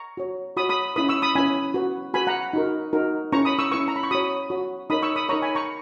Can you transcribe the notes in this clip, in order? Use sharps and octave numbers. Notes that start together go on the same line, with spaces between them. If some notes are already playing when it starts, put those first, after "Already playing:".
Already playing: A#5 C#6
F#4 C#5
F#4 C#5 B5 D#6
B5 D#6
C#4 E4 B4 B5 D#6
C#6 E6
B5 D#6
C#4 E4 B4 G#5 B5
F#4 B4
F#4 B4 G#5 B5
F#5 A#5
D#4 F#4 A#4
D#4 F#4 A#4
C#4 E4 B4 A#5 C#6
B5 D#6
C#6 E6
C#4 E4 B4 C#6 E6
A#5
B5
C#6
F#4 C#5 B5 D#6
F#4 C#5
D#4 A#4 C#5 B5 D#6
C#6 E6
B5 D#6
D#4 A#4 C#5 A#5 C#6
G#5 B5
A#5 C#6